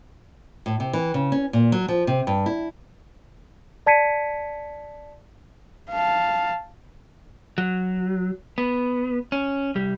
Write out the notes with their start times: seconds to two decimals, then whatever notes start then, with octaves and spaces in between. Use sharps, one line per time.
0.66 A2
0.80 C3
0.93 E3
1.14 C#3
1.32 C#4
1.53 A#2
1.72 F#3
1.88 F3
2.07 C3
2.27 G2
2.46 E4
3.86 D5 A5 G#6 B6 C#7 D#7
5.90 F5 A5
7.58 F#3
8.58 B3
9.32 C#4
9.75 C2 G3